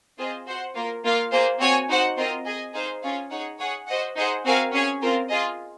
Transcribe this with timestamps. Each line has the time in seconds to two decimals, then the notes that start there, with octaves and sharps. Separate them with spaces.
0.18 C4 F4 G#4 C5 D#5
0.46 F#4 C5 F#5
0.74 A#3 F4 A#4
1.03 A#3 F4 A#4 F5
1.31 A#3 F4 G#4 C5
1.59 C4 F#4 C#5 G#5
1.89 D#4 F#4 C5 F#5
2.16 C4 F4 A#4 D#5
2.44 G#4 D#5 G#5
2.73 D#4 G#4 C5 F5
3.02 C#4 F4 G#4 C#5 F5
3.31 D#4 G#4 C#5 F#5
3.59 G#4 C#5 F#5
3.87 F#4 C5 D#5 F#5
4.16 D#4 G#4 C5 F#5
4.44 C4 F#4 A#4 F5 G#5
4.72 C#4 G#4 C#5 G#5
5.01 C4 F4 A#4
5.29 F4 G#4 D#5